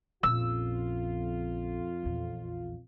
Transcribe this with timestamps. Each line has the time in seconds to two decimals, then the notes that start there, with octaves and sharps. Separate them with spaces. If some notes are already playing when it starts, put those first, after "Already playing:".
0.23 A#1 F2 C#4 F4 E6
2.03 A#1 E2